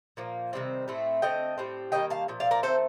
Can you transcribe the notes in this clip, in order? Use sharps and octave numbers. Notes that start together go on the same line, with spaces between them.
A#2 F3 A#3
C3 D#3 G3 C4
A2 A3 C4
D3 A3 C4 D#5 G5
A2 G3 C4
D#3 G3 A#3 D#5 G5
F5 A5
A#2 F3
D5 F5
A#4 D5
D#3 A3 C4 A4 C5